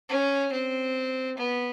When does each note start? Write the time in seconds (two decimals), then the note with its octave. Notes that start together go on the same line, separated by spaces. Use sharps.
0.09 C#4
0.52 C4
1.38 B3